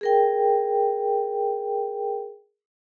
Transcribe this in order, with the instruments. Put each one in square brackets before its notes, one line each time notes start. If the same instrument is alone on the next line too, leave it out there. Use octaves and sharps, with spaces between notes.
[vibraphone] G#4 A#4 G5